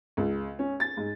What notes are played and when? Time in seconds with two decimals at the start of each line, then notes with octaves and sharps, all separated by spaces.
0.17 C#2
0.59 C#4
0.80 A6
0.97 G#2